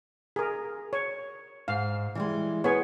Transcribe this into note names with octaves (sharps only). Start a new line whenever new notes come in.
G#4 A#4
C#5
G#2 F5
E3 G3 G#3
B3 G#4 C#5